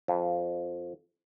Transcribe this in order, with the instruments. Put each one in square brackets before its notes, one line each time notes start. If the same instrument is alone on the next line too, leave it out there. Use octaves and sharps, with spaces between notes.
[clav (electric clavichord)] F2